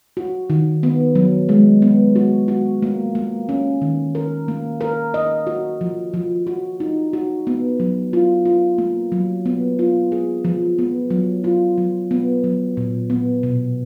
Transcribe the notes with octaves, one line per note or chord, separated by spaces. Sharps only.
F#4
D#3
B3
F#3
G#3
B3
F#4
F#4
A#3
A#3
C#4
D#3
A#4
A#3
A#4
D#5
F#4
F3
F3
F#4
D#4
F#4
B3
F#3
F4
F4
A#3
F#3
B3
F4
G#4
F3
B3
F#3
F4
F#3
B3
F#3
A#2
B3
B2